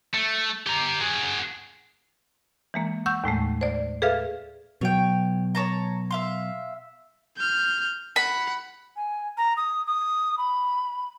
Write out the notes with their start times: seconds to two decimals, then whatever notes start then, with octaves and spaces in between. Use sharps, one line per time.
0.14 A3
0.66 G4 A#5
1.01 F#4 G#4
2.74 E3 G#3 A#3
3.06 F#5 C#6 E6 G6
3.24 D#2 A2 G#3 A3
3.61 C5 D5
4.02 G#4 A4 B4 E5 F5 F6
4.81 B2 F#3 C#5 G5
5.55 C#5 A5 A#5
6.11 E5 F5 C6
7.37 F6 G6
8.16 F#5 B5
8.96 G#5
9.37 A#5
9.57 D#6
9.86 D#6
10.38 B5